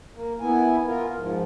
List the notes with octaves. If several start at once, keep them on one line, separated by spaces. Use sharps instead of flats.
A#3
B3 E4 G#5
F4 A#4
G#2 F3